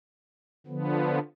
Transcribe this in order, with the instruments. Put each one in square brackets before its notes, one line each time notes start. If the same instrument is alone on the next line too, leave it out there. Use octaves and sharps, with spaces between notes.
[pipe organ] D3 F3 B3